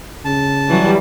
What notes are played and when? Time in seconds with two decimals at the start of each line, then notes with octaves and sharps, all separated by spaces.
0.25 C#3 A5
0.69 E3 F#3 G3